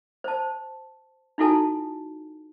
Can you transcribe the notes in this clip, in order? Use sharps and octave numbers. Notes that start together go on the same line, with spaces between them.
C5 A5
D#4 E4 F#4 A4 G#5 A5